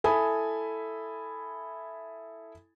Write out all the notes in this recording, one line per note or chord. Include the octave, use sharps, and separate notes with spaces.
E4 A4 G#5 B5 D#6